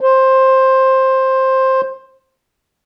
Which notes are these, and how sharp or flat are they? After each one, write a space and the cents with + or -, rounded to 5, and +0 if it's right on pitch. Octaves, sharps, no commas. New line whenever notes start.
C5 +10